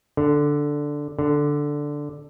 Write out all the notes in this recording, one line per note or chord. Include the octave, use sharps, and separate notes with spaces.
D3
D3